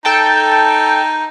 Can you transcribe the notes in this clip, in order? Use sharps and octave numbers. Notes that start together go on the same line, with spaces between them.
D#4 A4 G5 A5